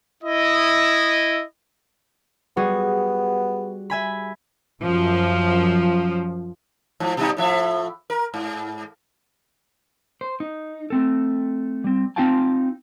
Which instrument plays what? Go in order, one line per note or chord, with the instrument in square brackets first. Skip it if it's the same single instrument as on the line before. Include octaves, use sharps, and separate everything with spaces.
[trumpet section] E4 D#5
[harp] G3 F#4 G#4 [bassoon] B3
[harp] E5 G#5 B5
[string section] F#2 F3
[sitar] G#2 F3
B2 G3 D#4
A2 F3 E5
A#4
G#2
[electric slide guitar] C5
D#4
A3 C4 A4
G3 C4
C4 D#4 F4 F5 G5 A5